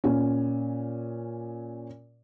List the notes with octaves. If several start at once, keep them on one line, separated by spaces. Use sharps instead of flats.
A#2 C#4